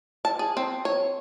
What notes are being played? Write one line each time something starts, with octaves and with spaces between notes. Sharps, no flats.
A5
G#4
C4
C#5